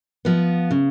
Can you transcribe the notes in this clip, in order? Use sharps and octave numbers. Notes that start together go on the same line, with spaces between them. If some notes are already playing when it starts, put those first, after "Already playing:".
F3 B3
C#3